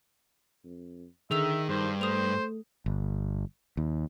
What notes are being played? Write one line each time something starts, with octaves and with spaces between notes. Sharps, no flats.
F2
D3 D#3 G#4 E5 E6 F7
G2 D#3 C5
A3 C5 D#6 F7
G1
D#2